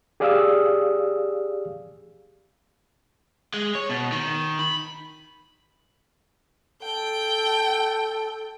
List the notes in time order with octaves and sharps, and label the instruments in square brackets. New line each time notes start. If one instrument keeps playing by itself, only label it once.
[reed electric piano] G4 G#4 D5 F5 D#6 E6
[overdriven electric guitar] G#3
C#5
B2
D#3
B5
[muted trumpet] A4 [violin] G5